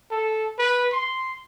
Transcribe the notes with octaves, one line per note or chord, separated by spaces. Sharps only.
A4
B4
C6